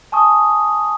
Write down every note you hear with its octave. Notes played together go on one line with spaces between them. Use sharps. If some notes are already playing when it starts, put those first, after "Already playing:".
G#5 A5 C#6 D#6